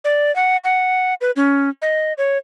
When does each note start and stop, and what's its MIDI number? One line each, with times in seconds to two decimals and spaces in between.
0.04 0.34 74
0.36 0.57 78
0.64 1.14 78
1.21 1.31 71
1.36 1.70 61
1.82 2.13 75
2.18 2.38 73